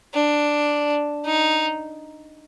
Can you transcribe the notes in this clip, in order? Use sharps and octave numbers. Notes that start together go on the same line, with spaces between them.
D4
D#4